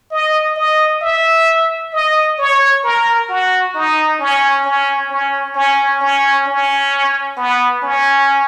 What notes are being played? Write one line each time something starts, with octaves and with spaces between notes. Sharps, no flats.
D#5
D#5
E5
D#5
C#5
A#4
F#4
D#4
C#4
C#4
C#4
C#4
C#4
C#4
B3
C#4